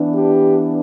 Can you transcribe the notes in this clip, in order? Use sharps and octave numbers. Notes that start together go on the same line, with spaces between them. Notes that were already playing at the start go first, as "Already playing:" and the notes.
Already playing: E3 B3 D4
G4